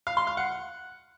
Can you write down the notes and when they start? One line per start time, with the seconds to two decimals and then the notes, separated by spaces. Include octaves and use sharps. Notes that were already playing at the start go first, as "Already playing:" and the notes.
0.07 F5
0.17 C6
0.27 F5
0.37 F#5